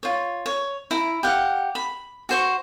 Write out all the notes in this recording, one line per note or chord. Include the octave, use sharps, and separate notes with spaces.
F4 C#5
C#5
E4 A#5
G4 F5 F#5
B5
F#4 C5 C#6